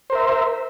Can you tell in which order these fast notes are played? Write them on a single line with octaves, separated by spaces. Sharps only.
C5 A#4 E5